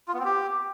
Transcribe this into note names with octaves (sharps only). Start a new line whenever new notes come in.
F4
B3
C4
G4